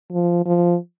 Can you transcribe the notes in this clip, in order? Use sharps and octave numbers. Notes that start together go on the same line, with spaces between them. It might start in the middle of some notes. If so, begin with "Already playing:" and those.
F3
F3